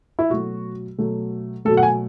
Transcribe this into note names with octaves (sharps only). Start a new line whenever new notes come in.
E4
B2 F#3 A3 F#4
B2 F#3 A3
B2 F#3 A3 A4
F#5
G#5